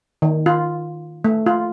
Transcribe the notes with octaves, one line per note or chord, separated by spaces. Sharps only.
D#3
F4
A3
F4